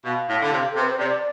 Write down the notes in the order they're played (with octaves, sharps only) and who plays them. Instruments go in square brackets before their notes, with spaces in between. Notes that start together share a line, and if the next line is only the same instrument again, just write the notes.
[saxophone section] B2 [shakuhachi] F5
[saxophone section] A2
D3
C3
[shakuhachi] A4
[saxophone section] C3
[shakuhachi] B4
C5
[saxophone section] C3 [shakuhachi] D5